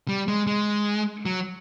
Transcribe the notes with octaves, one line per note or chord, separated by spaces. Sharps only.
G3
G#3
G#3
F#3